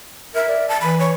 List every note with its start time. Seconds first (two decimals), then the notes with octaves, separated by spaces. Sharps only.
0.35 A#4 E5
0.49 D5
0.69 A5
0.81 E3 B5
1.00 C#5